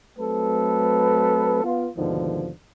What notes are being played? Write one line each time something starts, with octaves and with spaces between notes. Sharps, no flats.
F#3 A3 C4 A4 B4
B3 F4
D#2 G#2 B2 D3 D#3 F3